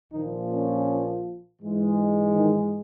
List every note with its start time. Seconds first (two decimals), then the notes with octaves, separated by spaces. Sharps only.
0.12 A#1 A#2 D#3 F3 D#4
0.49 C#4
1.61 G#2 E3 G#3
2.36 D#3 D#4